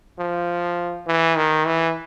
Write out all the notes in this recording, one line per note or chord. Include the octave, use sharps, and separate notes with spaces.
F3
E3
D#3
E3